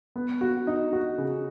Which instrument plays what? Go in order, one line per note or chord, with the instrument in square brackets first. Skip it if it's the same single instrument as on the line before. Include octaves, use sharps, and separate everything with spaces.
[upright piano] B3
F#4
D#4
F#4
C#3